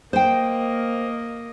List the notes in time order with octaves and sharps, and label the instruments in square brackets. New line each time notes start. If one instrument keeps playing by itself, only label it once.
[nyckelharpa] A#3 D#5 [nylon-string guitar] C5 G5